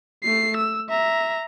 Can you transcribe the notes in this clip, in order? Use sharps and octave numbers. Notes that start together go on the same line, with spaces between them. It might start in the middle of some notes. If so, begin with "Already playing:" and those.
A3 C7
E6
E5 A#5